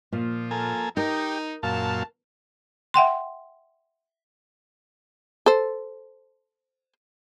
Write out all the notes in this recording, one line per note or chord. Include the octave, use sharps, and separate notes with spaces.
A#2 F3 F4
A#3 A4 G#5
D#4 G4 A#4
F#2 A#2 F5 A5
E5 F#5 G5 C6
A4 C5